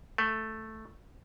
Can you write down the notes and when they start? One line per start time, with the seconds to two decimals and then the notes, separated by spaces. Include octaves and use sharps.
0.18 A3